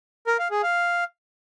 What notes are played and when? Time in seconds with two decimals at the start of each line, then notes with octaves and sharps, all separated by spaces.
0.27 A#4
0.39 F5
0.51 G#4
0.63 F5